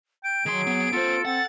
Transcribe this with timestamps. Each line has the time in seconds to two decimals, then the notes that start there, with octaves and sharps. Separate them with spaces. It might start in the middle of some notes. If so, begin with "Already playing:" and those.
0.24 G5 D7
0.46 D#3 F#3 G#4 C6
0.67 B3
0.93 B3 F4 A4 C5
1.25 C4 F#5 A6